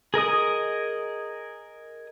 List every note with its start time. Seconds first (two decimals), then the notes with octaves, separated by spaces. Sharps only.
0.14 G#4 A#4 D#5 D#6